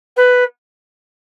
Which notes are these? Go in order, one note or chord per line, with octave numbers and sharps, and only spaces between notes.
B4